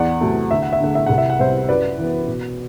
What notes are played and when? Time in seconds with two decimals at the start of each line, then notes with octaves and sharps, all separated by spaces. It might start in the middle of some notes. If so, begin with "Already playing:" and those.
Already playing: E2 D5 F#5
0.21 C3 F#3 A3
0.51 D2 E5
0.62 F#5
0.73 E5
0.80 D3 A3 F#5
0.95 E5
1.06 C2 F#5
1.18 E5
1.30 F#5
1.39 C3 G3 B3 C5 E5
1.68 F#2 B4 D5
1.98 E3 B3
2.28 B2